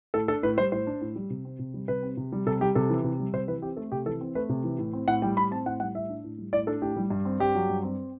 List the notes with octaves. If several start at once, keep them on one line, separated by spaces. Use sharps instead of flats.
A2 A4
D4 A4
A2 B4
G3 C5
A2 C5
D4
A2
G3
C3
C4
C3
G3
C3 B4
C4
C3
G3
C3 A4
G3 G4
C3 A4
E3
C3
G3
C3 C5
E3 B4
C4 G4
A3 A4
C3 G4
E3 A4
C4
A3 B4
C3
E3
A2
C4
A2 F#5
G3 G5
A2 B5
C4 A5
A2 F#5
G3 F#5
A2 E5
D4
A2
G3
A2 D5
D4 A4
A2 G4
G3
G2
C4
G2 G4
F#3
G2
C4